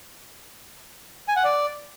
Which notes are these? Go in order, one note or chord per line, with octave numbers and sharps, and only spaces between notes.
G#5
F#5
D5